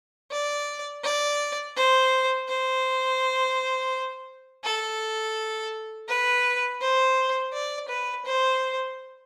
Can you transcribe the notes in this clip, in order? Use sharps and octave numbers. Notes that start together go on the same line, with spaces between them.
D5
D5
C5
C5
A4
B4
C5
D5
B4
C5